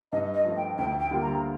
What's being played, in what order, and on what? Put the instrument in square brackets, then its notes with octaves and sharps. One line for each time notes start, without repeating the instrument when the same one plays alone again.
[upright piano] G2 [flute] D#5
[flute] D#5
[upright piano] F3 A3
[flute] G5
[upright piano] D2 [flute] G5
[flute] G5
[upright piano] D3 G3 A#3 F4
[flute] A#5